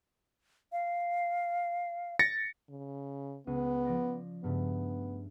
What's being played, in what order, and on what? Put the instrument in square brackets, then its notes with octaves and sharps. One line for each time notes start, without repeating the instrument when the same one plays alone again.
[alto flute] F5
[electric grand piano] A6 A#6 C#7
[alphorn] C#3
[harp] C#2 D#7 [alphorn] B3
[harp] F3 D5 A#6
[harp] G2 C#3 A3 [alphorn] B3